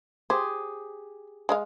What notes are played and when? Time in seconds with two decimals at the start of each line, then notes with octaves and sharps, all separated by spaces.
0.30 G4 G#4 C5
1.49 G#3 D#5 F5